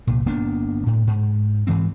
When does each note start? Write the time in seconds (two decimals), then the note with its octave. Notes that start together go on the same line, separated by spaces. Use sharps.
0.07 C2 A#2
0.26 G1 A#3 B3 D4
0.86 A2
1.07 G#2
1.67 G#2 E3 G#3 C4